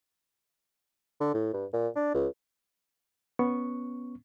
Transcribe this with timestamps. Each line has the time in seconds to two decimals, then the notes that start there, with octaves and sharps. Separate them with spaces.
1.20 D3
1.34 A2
1.53 G2
1.73 A#2
1.96 D4
2.14 C#2
3.39 B3 C#4 C#6